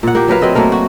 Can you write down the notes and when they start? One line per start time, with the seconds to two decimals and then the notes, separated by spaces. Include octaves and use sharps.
0.03 A#2 F#5
0.15 A#3 G4
0.28 F#3 A#4 B4 F5
0.41 F#3 C4 D#5 E5
0.55 F#3 A3 A#3 A#4
0.72 F#4